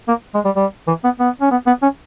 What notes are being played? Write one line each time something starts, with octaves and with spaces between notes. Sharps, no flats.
A#3
G#3
G3
G3
E3
B3
B3
C#4
B3
B3
C#4